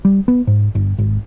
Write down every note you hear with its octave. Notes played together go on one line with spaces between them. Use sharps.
G3
B3
G#2
G1
G#1